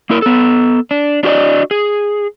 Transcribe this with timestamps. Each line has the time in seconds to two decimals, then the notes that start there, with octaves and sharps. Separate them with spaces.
0.10 A#3 E4 A#4
0.22 B3 A4
0.91 D4
1.23 D4 F#4 G4 C5 D5 D#5
1.71 G#4